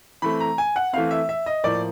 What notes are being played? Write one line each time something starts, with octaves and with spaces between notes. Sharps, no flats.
E3 A3 C4 B5
A#5
G#5
F#5
E3 A3 C4 F5
E5
E5
D#5
A2 F3 A#3 D5